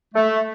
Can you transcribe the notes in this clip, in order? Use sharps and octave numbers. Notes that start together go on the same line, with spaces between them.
A3